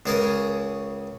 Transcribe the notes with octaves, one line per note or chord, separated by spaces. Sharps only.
C#2 C#3 G#4 A#4 A5 D#6